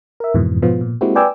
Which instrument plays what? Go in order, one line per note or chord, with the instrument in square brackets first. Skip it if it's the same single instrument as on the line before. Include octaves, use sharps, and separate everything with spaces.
[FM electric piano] A#4 E5
F2 G#2 B2 E3
G#2 B2 F3 B3 F4
A#2
G#3 A#3 C4 E4 F#4 G4
B4 D5 G5 G#5 D6 E6